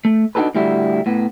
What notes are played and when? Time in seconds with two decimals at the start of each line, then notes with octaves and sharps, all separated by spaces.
0.05 A3
0.35 D4 D#4 F#4 G4 A4 B4
0.55 A2 D3 G3 E4 F#4
1.06 A2 B3